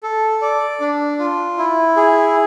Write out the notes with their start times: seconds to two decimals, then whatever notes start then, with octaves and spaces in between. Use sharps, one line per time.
0.03 A4
0.42 D5
0.80 D4
1.19 F4
1.58 E4
1.96 G#4